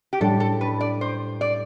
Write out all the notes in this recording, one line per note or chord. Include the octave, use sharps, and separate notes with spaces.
G4
A2 G3 D4 A4
A4
B4
D5
C5
D5